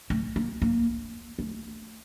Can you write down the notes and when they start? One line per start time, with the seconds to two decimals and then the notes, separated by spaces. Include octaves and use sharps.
0.10 A3
0.36 A#3
0.62 A#3
1.39 A3